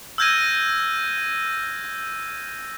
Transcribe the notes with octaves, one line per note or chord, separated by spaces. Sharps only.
E6 F6 G6 G#6 A#6 D#7